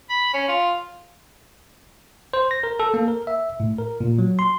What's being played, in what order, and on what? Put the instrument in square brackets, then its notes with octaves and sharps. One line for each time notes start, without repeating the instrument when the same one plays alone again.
[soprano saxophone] B5
C#4
F4
[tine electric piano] C5
A#6
A#4
A4
A#3
A#4
E5
A2
A#4
A#2
F#3
C6